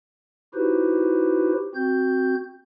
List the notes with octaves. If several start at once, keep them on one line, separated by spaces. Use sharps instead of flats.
D#4 E4 F#4 G4 B4 C5
C4 F#4 G6